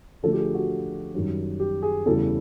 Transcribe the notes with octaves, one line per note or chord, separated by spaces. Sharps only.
D3 F3 A3 D4 F4 A4
G4
G#4
F#4
F#2 D#3 G3
G4
G#4
E2 C#3 E3 G3 A4